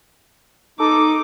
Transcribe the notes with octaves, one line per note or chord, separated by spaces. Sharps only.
D#4 A4 D6